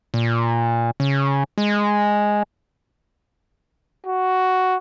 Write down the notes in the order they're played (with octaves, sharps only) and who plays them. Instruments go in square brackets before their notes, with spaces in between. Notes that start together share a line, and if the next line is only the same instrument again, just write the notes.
[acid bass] A#2
C#3
G#3
[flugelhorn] F#4